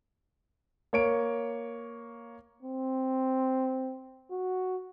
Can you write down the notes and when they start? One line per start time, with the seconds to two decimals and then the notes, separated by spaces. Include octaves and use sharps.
0.93 A#3 C#5 D7
2.63 C4
4.30 F#4